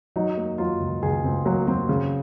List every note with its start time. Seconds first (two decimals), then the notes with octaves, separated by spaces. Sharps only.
0.16 F#3 D#4
0.37 A#3
0.58 F#3 F4
0.80 C#2
1.03 C#2 G#4
1.24 C#2 C4
1.45 F#3 A#3
1.67 F#3 C4
1.89 C#3